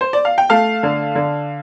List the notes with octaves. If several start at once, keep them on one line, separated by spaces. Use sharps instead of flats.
C5
D5
F5
G5
A3 F5 A5
D3
D3